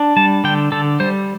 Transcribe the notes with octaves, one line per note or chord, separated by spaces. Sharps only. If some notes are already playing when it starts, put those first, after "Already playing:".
Already playing: D4
G3 A5
D3 G5
D3 A4
G3 C5